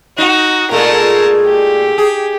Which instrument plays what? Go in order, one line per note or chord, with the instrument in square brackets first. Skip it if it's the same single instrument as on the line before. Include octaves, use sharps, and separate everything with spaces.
[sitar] D#4 [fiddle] F#4
[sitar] A#2 G#3 A3 [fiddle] A#4 A5
[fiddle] G4
[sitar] G#4